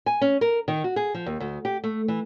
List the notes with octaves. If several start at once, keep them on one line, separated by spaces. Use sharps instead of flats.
G#5
C#4
A#4
D#3
F#4
G#4
F3
D#2
D2
G4
A3
E3